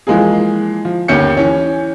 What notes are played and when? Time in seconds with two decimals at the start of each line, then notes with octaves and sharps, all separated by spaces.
0.07 E3 F3 G#3 A#3 G#4
0.85 F3
1.08 G1 D#2 C#4 G6 C#7
1.37 E3 C#4